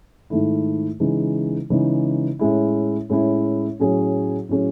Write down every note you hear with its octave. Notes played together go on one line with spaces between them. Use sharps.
G#2 D#3 A3 E4
C#3 E3 G#3 D#4
C#3 E3 G#3 D#4
A2 G#3 C#4 E4
A2 G#3 C#4 E4
A2 F#3 C#4 G#4
A2 F#3 C#4 G#4